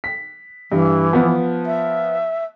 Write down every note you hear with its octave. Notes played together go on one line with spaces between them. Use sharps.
B6
G2 E3
F3 B3
E5